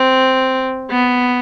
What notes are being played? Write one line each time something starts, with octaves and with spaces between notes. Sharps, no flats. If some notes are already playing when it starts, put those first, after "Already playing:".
Already playing: C4
B3